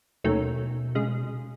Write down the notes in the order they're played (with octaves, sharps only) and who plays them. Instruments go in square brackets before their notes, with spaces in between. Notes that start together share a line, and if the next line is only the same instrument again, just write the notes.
[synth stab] D#2 D#3 F#3 A3 C#4 [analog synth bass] B2
[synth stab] C#3 G#3